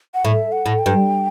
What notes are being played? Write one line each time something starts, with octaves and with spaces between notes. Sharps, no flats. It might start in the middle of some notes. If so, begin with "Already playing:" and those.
F#5
A2 E5
F#5
A2
G5
G2